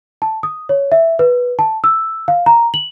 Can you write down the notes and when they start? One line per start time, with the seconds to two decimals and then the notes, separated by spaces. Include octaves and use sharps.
0.22 A5
0.43 D#6
0.69 C#5
0.92 E5
1.19 B4
1.59 A5
1.84 E6
2.28 F5
2.46 A#5
2.74 F#7